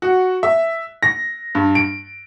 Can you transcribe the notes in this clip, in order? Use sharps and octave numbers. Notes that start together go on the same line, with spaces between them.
F#4
E5
A#6
G2
D7